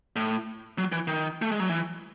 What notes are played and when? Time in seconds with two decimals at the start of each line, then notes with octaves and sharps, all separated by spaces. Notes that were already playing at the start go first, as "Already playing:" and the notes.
0.16 A2
0.78 F#3
0.92 E3
1.07 D#3
1.42 A3
1.51 G#3
1.60 F#3
1.69 E3